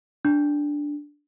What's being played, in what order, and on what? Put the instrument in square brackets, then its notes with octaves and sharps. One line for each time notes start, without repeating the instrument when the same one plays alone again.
[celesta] D4